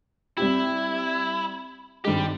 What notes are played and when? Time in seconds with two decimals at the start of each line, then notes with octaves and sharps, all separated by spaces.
0.37 G3 C4 E4 G4
2.05 G#1 G2 G3 G#3 G4